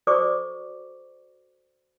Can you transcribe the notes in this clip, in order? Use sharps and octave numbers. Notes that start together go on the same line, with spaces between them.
F#4 A4 C5 D5 C#6 D6